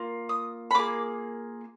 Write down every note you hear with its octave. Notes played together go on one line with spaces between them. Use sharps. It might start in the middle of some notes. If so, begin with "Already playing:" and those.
Already playing: A#3 F4
D#6
B5
A#3 F4 G#4 D6